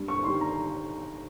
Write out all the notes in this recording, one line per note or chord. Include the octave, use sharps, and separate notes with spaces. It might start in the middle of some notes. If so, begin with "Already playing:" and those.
Already playing: G2
C#6
D#3 G3 C6
A#5